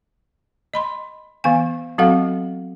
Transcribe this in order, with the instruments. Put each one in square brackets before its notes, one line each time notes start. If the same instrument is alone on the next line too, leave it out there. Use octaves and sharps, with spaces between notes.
[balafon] D#5 B5 C6
E3 B3 F5 G#5
F#3 C4 F#4 A4 F5 F#5